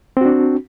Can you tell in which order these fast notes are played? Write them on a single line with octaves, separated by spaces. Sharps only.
C4 F#4 D4